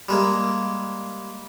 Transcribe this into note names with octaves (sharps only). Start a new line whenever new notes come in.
G3 G#3 A#3